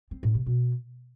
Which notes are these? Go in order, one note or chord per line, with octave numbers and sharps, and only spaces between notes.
C4
A2
C3
B2